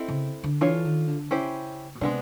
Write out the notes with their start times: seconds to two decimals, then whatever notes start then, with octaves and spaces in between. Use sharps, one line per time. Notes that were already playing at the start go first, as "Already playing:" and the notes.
Already playing: C4 E4 A4 C5 D#5
0.08 C#3
0.44 D3
0.61 E3 D4 F4 A4 C#5
0.85 D#3
1.08 D3
1.31 C#3 C#4 E4 G4 C5
1.95 B2
2.01 C3 G#3 B3 D4